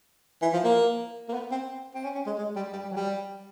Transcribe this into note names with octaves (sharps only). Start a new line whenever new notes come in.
E3
F3
A#3
A#3
B3
C4
C4
C#4
C#4
G#3
G#3
G3
G3
G3
F#3
G3